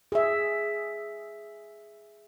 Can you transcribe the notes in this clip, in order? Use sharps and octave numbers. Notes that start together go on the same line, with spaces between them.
G#4 E5